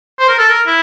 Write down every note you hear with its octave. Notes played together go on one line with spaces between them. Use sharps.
C5
A#4
A4
A#4
E4